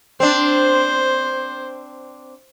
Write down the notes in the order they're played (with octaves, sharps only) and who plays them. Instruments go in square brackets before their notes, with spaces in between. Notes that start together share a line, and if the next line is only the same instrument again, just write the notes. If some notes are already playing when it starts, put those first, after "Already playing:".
[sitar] C4 D4 [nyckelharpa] C5